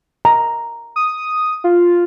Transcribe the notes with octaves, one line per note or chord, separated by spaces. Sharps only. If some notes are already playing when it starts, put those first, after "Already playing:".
A#5
D#6
F4